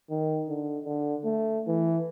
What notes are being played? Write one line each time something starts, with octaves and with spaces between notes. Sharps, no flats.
D#3
D3
D3
A3
E3